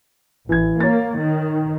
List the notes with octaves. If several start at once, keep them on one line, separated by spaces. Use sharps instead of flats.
A1 E3 G#6
A#3 C#5 A6
D#3